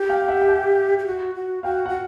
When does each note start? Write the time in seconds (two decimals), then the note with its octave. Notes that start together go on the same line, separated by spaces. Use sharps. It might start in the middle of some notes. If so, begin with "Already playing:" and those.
Already playing: G4
0.09 F5 G5
0.22 F5
0.28 E5 F#5
0.41 G5
0.48 F#5 G#5
0.99 G4
1.06 F#4
1.35 F#4
1.63 F#4 F5 G5
1.86 F#5
1.89 F#4